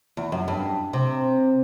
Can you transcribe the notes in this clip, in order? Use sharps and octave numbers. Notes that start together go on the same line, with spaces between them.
E2
F#2
G2
C3